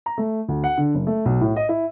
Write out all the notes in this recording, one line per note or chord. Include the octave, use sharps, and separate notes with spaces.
A#5
A3
D2
F#5
D3
F#1
A3
B1
A2
D#5
E4